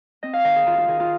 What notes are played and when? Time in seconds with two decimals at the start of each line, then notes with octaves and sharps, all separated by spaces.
0.23 C4 D#5
0.33 F5
0.44 D#3 D#5
0.56 G#4
0.66 D#3 F4
0.78 F4
0.88 D#3 G#4
1.00 F4